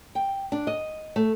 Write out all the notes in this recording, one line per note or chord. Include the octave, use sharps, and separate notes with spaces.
G5
D4
D#5
A3